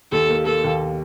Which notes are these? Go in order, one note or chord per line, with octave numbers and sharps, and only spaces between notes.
D#2 A4
A#3
A#3 A4
D#2